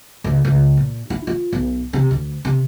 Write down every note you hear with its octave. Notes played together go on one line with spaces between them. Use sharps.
C#2
C#2
A#2
E4
F4
B1
C3
D2
C3